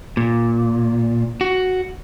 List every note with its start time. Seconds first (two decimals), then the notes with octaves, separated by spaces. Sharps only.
0.17 A#2
1.41 F#4